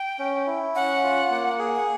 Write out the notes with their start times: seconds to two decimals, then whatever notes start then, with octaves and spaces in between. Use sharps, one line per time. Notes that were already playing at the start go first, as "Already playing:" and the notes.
Already playing: G5
0.19 C#4
0.47 E4
0.75 C#4 F#5
1.03 F4
1.30 A#3
1.59 G#4
1.75 F#5